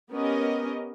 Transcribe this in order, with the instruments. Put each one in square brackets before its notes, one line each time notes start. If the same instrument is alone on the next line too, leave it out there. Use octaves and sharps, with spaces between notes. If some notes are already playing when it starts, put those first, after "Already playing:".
[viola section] B3 C#4 G4 A#4 D#5